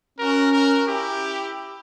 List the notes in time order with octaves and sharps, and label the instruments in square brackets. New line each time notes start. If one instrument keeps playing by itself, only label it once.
[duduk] C#4 [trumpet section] F#4 A#4
[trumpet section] F#4 A#4
E4 G4